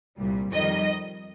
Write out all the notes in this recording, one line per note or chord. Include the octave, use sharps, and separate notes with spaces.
C2 A#2 G3
F2 D#3 G3 D#5